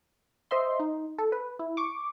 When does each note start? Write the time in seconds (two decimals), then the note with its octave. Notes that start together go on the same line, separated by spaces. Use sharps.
0.51 C5 D#5 E5 C6
0.80 D#4
1.18 A4
1.32 B4
1.59 E4
1.77 C#6 D6